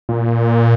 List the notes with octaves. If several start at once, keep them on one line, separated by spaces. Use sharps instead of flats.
A#2